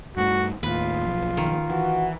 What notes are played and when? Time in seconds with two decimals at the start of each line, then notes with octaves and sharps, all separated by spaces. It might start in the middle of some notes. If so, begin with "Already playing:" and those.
0.17 G2 A3 F#4
0.63 D#2 A2 F4 B4
1.06 B1 F3
1.37 D#3
1.70 E3 F#4